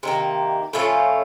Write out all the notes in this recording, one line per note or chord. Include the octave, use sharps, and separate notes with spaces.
C3 D#3 A#3
A2 F3 A3 C#4